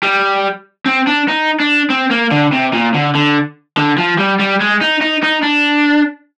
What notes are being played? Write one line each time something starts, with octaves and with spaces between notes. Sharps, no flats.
G3
C4
D4
D#4
D4
C4
A#3
D3
C3
A#2
D3
D3
D3
F3
G3
G3
G#3
D#4
D#4
D#4
D4